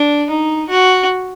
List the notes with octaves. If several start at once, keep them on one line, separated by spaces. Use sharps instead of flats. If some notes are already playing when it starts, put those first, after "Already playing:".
Already playing: D4
D#4
F#4